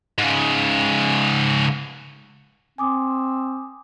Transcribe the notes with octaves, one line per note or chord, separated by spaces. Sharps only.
G#2 C#3
C4 G#5 D6 D#6